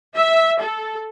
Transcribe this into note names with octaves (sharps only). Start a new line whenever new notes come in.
E5
A4